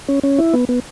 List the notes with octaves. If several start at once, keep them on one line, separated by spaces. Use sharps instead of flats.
C#4
C#4
E4
B3
B3